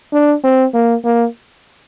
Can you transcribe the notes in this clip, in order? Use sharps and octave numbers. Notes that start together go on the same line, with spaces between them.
D4
C4
A#3
A#3